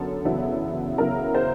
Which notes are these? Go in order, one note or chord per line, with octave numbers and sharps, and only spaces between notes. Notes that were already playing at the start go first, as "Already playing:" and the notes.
Already playing: F#2 D3 F#3 B3 A4
E2 C#3 F#3 B3 E4
C#3 F#3 B3 E4 A#4
C5